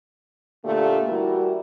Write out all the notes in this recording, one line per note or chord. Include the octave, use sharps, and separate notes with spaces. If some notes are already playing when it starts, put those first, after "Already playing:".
A#2 D3 A3 A#3 G4
E3 G3 E4 F#4 A#4